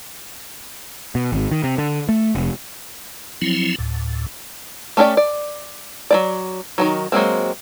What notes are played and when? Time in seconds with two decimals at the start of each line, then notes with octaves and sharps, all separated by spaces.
1.15 B2
1.32 G#1
1.51 D#3
1.64 C3
1.78 D3
2.09 A3
2.35 F1
3.42 F3 F#3 C4 E4
3.78 D2 A2
4.97 A3 C#4 G4 A#4 D5
5.17 D5
6.11 F#3 A#3 D5
6.78 D#3 E3 F#3
7.12 F#3 G#3 A#3 C4